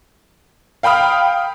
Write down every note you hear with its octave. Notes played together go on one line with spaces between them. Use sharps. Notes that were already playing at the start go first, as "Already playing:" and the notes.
F5 G5 B5 D#6 F6